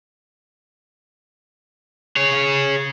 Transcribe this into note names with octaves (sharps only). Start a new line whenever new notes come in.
G#4 C#5